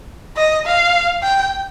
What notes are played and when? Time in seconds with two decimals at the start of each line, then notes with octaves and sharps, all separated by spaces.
0.37 D#5
0.66 F5
1.23 G5